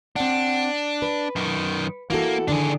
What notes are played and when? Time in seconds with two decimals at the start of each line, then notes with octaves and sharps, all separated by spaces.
0.16 C4 D4 F#5
1.02 B4
1.36 F#2 D#3
2.10 E3 A#3 F#4 A4
2.48 D3 D#3 D4 G#4